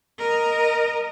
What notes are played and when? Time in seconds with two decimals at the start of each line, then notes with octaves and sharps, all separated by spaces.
0.19 A#4 D#5